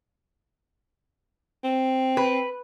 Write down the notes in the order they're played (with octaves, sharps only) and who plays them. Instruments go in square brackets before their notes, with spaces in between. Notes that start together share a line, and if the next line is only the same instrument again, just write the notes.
[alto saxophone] C4
[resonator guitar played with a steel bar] B4